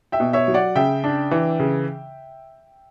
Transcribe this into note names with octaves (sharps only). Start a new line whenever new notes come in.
E5 G5
B2
C#5 E5
F#3
D5 F#5
C#3 E5 G5
D4
E3
C#3